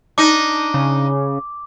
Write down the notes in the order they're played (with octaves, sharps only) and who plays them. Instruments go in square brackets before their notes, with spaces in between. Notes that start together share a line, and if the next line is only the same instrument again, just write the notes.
[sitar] D4 D#4 [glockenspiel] D6
[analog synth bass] C#3